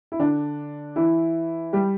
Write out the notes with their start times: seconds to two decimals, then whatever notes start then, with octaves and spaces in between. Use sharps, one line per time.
0.12 E4
0.19 D3 D4
0.96 E3 E4
1.73 G3 G4